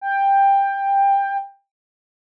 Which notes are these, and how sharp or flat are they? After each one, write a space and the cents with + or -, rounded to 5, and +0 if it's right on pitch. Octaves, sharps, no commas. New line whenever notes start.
G5 +15